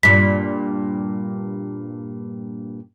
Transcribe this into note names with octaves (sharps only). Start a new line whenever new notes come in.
G2 A#2 B6